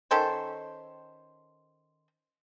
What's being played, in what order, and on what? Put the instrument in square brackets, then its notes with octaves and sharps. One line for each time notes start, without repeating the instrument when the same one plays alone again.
[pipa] D#3 C#4 A4 C5